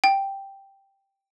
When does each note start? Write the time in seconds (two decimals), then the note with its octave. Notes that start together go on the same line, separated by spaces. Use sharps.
0.04 G5